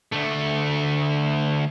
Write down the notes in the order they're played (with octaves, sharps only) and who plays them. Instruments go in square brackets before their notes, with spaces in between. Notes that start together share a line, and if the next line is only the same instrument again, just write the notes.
[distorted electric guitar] D2 A3